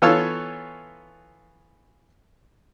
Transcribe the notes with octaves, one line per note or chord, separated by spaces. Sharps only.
E3 B3 F4 A4 C#5 E6